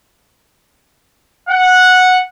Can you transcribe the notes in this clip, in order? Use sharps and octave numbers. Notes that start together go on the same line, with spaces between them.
F#5